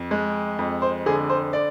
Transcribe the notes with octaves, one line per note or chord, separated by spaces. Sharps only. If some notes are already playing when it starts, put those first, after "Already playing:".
Already playing: F2
G#3
F2
C5
D3 G#4
C5
D5